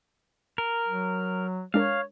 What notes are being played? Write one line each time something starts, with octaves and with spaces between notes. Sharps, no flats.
A#4
F#3
G#3 D4 A#4 C#5 F5